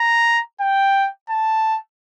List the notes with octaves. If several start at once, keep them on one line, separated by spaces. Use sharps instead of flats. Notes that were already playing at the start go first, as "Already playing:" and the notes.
Already playing: A#5
G5
A5